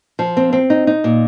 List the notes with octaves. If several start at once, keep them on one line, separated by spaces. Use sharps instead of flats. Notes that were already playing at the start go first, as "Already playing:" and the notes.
F3
C4
C4
D#4
D#4
A#2